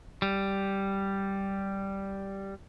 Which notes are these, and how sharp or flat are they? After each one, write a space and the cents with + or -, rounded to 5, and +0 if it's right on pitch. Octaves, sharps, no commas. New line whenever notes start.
G3 -5